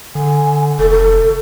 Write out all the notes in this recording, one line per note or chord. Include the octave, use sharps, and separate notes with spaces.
D3 G#5
F1 A4
A4